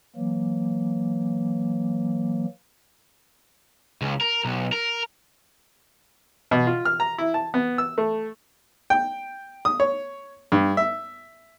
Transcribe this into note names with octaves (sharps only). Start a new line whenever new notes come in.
E3 F#3 A#3
C#2
A#4
B1
A#4
B2
F4
F6
A#5
E4
A5
B3
E6
A3
G5
D#6
C#5
G2
E5